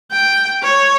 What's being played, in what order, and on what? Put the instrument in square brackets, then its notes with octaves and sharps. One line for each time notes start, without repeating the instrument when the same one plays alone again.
[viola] G5
C#5